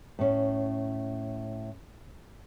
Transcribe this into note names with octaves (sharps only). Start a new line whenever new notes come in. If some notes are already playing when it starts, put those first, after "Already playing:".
A2 C#4